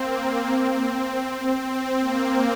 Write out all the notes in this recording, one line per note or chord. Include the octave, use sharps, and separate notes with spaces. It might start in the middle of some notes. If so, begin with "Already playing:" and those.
Already playing: A#3 C4
A#3
C4
C4
A#3